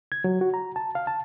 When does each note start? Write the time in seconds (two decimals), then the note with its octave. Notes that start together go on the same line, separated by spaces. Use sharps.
0.12 G#6
0.24 F#3
0.41 F#4
0.54 A#5
0.76 A5
0.95 F5
1.07 A5